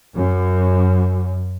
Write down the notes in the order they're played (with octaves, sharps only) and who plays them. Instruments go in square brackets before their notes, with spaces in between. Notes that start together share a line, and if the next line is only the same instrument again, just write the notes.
[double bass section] F#2